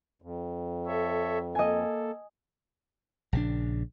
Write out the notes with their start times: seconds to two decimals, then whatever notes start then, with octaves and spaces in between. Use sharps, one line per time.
0.22 F2
0.87 A4 C#5 E5
1.55 A#3 A4 D#5 G#5
3.33 A#1 C#3 E3 D4